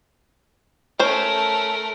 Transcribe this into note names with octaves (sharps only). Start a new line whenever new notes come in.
A3 C#4 A#4 C5